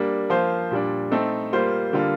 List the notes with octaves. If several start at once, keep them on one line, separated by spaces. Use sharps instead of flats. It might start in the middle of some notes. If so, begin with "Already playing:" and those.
Already playing: G3 A#3 D4
F3 A#3 F4 C5
A#2 G3 D4
A3 C4 D#4 A4
G3 A#3 F4 C5
D3 G3 A#3 F4